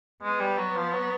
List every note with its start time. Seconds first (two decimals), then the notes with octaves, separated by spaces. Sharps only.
0.23 G#3 B3
0.40 G3
0.58 F#3
0.75 F3
0.92 F#3